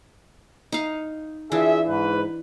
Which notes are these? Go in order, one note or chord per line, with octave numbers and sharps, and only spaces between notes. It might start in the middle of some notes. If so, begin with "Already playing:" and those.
D#4 F5
E3 D4 F4 G#4 E5
G#2 B4